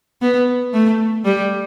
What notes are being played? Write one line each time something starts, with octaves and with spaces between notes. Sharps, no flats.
B3
A3
G3